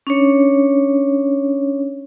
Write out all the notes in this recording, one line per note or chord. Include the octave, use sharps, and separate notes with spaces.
C#4 D4 C#5